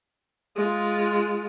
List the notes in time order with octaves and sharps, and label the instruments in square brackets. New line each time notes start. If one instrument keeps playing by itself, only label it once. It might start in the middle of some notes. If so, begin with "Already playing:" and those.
[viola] G#3 F4